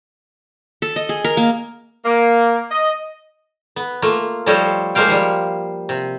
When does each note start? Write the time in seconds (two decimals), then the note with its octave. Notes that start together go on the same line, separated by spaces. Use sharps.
0.82 A4
0.96 D#5
1.09 G#4
1.25 A#4
1.37 A#3
2.04 A#3
2.71 D#5
3.76 B3
4.02 A3 A#3 F4
4.46 F3 G3 A4 C5 C#5 D#5
4.95 G#3 A#3 C5 F5 G5
5.08 F3 G3
5.89 C3